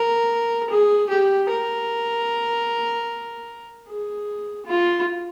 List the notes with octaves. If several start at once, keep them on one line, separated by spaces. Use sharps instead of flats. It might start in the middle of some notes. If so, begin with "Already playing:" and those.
Already playing: A#4
G#4
G4
A#4
G#4
F4